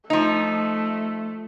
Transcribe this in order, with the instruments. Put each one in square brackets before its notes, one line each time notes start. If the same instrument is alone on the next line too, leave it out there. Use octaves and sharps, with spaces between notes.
[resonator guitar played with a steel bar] F3 D#4 [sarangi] A3